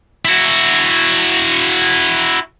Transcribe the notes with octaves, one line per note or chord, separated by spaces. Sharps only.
E4 F#4